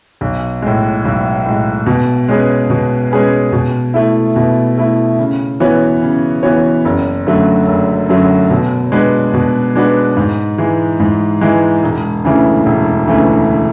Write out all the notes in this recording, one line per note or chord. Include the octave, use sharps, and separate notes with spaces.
B1
A2 G#3
B1
A2 G#3
B2
G#3 C#4 G#4 B4
B2
G#3 C#4 G#4 B4
B2
A3 E4
B2
A3 E4
C#3
E3 B3 F#4 C#5
C#3
E3 B3 F#4 C#5
F#1
F#2 D3 F#3 A3
F#1
F#2 D3 F#3 A3
B2
G#3 D4 F#4 B4
B2
G#3 D4 F#4 B4
G#2
E3 G#3
G#2
E3 G#3
E1
D2 C#3 E3 A3
E1
D2 C#3 E3 A3